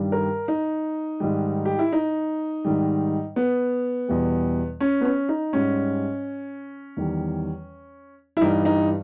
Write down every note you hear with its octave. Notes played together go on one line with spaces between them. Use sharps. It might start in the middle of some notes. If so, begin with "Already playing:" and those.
Already playing: G2 D#3 G3
A#4
D#4
G#2 D#3 G3
G4
E4
D#4
G#2 D#3 G3
B3
E2 B2 G3
C#4
B3
C#4
D#4
G#2 G3 C#4
E2 D#3 G3
E4
G2 E3 G3 D#4
D#4